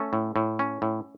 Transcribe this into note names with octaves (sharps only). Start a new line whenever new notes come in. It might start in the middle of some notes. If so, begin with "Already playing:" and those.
Already playing: A3 C#4 A4
A2
A2
C#4
A2